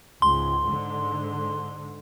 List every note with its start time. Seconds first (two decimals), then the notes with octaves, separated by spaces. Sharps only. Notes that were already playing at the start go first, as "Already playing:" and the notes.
0.22 C#2 G#2 C6
0.69 G#2 D3